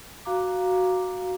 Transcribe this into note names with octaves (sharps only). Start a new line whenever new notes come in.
F#4 F5 A#5 D6